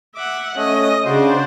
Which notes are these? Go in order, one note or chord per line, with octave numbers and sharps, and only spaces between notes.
E5 F#5 D6
A3 C#4 D#5
C#3 D4 F#4 C5 C6